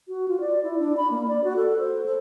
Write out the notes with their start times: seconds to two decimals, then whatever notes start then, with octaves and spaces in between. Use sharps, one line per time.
0.08 F#4
0.28 F4
0.40 D5
0.64 E4
0.79 D4
0.97 B5
1.11 A#3
1.28 D5
1.44 F#4
1.56 A4
1.79 C5
2.06 A4